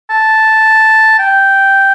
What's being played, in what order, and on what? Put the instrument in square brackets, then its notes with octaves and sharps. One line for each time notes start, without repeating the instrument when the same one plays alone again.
[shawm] A5
G5